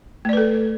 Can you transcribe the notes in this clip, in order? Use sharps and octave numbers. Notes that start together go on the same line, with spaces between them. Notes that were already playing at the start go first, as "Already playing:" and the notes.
A3 A4 B4 D5